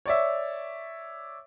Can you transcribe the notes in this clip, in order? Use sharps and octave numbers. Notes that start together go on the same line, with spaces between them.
C#5 D5 E5